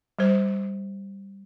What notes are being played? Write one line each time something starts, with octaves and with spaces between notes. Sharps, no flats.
G3 C5